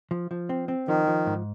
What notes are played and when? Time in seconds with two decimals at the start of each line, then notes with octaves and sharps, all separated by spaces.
0.11 F3
0.31 F3
0.49 C4
0.68 C4
0.88 D#3 F3
1.07 F3
1.26 G#2